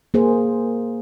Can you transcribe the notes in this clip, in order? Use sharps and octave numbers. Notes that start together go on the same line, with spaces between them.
A#3 G#4 C5